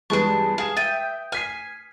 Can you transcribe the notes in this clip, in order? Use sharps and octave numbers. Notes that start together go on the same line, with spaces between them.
E2 G2 G#3 D4 B4 A5 C#6
G#4 F5 D#6 E7
E5 G5 A6 D#7
G#5 F6 B6 C7